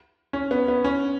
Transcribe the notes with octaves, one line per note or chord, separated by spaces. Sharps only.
C#4
B3
B3
C#4